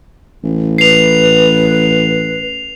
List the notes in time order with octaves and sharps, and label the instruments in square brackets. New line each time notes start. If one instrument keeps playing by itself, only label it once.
[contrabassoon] A1
[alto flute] B4 [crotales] C7 F7